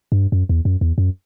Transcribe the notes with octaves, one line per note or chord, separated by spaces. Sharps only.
G2
F#2
E2
F#2
E2
F#2